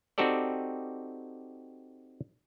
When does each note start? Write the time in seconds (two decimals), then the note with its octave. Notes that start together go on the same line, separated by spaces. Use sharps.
0.18 C4 D#4 F#4 G4 A4 D5